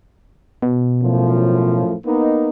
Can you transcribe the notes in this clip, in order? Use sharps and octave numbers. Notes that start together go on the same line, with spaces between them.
B2
F#2 A2 F3
A#3 B3 D#4